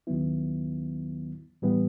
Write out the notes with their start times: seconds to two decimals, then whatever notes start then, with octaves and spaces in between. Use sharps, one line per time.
0.07 D#2 D#3 F#3 B3 E4
1.62 A2 E3 G3 B3